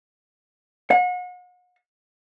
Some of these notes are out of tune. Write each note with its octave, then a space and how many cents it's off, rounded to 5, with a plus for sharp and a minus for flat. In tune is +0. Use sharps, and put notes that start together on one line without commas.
F#5 -40